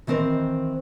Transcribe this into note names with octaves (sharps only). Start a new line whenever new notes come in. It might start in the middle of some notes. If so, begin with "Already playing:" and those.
D#3 E3 C4 A#4 C5